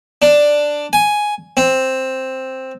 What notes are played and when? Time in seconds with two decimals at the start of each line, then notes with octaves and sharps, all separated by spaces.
0.22 D4
0.93 G#5
1.57 C4